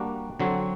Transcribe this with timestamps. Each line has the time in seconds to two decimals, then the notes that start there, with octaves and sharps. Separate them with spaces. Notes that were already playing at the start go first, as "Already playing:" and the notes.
Already playing: G3 A#3 D4 F#4
0.40 D3 F#3 C4 F#4